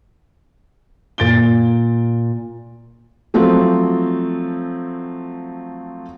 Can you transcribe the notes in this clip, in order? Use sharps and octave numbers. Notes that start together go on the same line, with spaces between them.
A#2 A6 D7 G7
F3 F#3 A3 C4